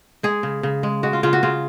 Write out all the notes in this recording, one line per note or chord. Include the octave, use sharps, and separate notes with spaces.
G#3 G#4
C#3
C#3
G#3
G#3 F#4
F4
C#3 F4
F#4
C#3 F4